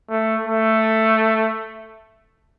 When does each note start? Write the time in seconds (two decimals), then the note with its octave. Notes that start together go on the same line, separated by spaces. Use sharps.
0.10 A3
0.47 A3